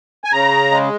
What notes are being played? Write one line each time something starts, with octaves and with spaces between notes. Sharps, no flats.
G#5
C#3 A#5
G#3